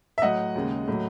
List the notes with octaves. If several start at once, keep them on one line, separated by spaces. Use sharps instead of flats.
E5
A2 F#3 D#5 F#5
D#2 C#3 G#3
A2 F#3